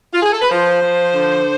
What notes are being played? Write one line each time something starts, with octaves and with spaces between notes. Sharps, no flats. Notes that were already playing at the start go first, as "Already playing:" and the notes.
F4
G#4
A4
B4
F3 C5
F3
D3